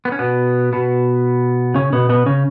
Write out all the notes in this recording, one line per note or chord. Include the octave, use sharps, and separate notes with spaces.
B3
C#4
B2 B3
B2 B3
C#3 C#4
B2 B3
B2 B3
C#3 C#4